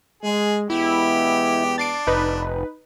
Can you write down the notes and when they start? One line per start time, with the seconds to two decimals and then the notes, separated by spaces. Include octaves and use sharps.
0.23 G#3 G#4
0.70 E2 G#3 B3 E4 G4
1.78 D4 A6 C7 D7
2.07 F1 D#4 B4